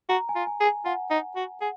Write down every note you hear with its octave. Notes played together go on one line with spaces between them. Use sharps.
F#4 A#5
G#5
F4
G#5
G#4
G#5
F4 F#5
D#4
F#4
G#4 F#5